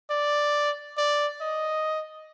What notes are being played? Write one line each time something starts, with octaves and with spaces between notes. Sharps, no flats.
D5
D5
D#5